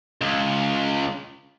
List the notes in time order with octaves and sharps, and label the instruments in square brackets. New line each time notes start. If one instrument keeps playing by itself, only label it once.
[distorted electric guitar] C#2